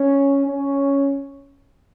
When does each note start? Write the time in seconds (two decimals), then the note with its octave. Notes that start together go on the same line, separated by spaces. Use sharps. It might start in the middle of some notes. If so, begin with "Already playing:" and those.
Already playing: C#4
0.47 C#4